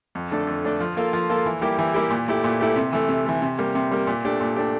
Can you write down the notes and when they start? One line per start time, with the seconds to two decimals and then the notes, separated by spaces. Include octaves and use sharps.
0.15 F2
0.31 D3 A3 D4 A4
0.47 F2
0.64 D3 A3 D4 A4
0.80 F3
0.97 A#3 F4 A4
1.13 F3
1.30 A#3 F4 A4
1.46 E3
1.61 G3 A#3 E4 G4
1.79 E3
1.94 G3 A#3 E4 G4
2.11 A#2
2.28 A3 E4 G4
2.44 A#2
2.61 A3 E4 G4
2.76 C3
2.93 E3 A3
3.09 C3
3.26 E3 A3
3.42 C3
3.59 G3 A#3
3.75 C3
3.91 G3 A#3
4.07 A#2
4.25 A3 D4 G4
4.41 A#2
4.56 A3 D4 G4